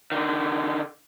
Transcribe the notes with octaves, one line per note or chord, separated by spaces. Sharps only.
D3 D#3